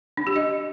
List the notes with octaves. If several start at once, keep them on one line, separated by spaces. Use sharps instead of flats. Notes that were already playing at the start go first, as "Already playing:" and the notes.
D4
G4
D#5